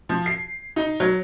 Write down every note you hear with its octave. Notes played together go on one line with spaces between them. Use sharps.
F3
C7
D#4
F#3